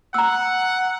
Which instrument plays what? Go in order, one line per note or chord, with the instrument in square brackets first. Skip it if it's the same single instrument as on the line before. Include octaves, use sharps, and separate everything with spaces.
[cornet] F#5 [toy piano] A#5 E6